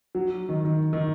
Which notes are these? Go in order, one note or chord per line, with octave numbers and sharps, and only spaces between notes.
F#3
D#3
D#3
D#3